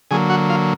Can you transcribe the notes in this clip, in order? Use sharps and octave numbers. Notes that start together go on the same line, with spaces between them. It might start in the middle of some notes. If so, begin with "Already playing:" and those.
D3 F#3 A#3 G#4 G#5
F#4 F#5
F4 F5